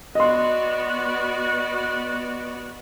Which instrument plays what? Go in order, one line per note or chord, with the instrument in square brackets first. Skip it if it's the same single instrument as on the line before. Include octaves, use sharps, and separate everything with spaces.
[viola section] B3 F#4 D5 [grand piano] D#5 C6